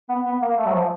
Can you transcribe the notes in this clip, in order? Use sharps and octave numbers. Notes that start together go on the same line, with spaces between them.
B3
B3
A#3
A3
F#3
F3